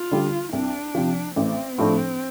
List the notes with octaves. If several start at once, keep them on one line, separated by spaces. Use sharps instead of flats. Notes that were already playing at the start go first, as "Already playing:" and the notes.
Already playing: F4
D3 G3
C2 D4
C3 F3
A1 C4
A2 F3 A3 D4